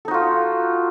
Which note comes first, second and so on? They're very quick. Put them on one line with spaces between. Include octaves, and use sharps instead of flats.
A4 D#4 F#4 F4